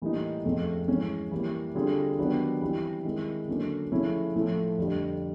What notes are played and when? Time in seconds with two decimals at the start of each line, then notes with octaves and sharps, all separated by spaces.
0.02 A2 E3 G3 A#3 D#4
0.45 F2 C#3 F3 A3 C4
0.88 G#2 E3 G#3 C#4
1.31 E3 G3 A#3
1.75 D3 G3 C4 F4 G#4
2.18 D#3 F#3 B3 D4 G4
2.62 E3 G3 C4
3.05 D#3 G#3 C4 E4
3.48 D3 F#3 A#3 C#4
3.91 C#3 F3 A3 C#4 E4
4.35 A2 F3 A3
4.78 F2 D3 G3